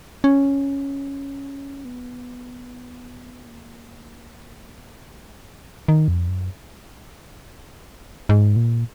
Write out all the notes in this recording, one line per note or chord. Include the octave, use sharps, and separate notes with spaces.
C#4
B3
A#3
G#3
A#3
G#3
F#3
F3
D#3
F2
F#2
G#2
A#2